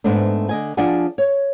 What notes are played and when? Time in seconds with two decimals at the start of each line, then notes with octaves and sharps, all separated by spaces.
0.04 G#2 A3 B3 C4 D4
0.49 D3 D#5 G#5
0.77 F3 D4 G#4 D5 F#5 G#5
1.18 C#5